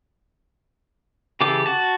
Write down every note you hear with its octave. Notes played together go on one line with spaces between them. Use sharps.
C#3 E3 G4 A4 D6
F#4 A5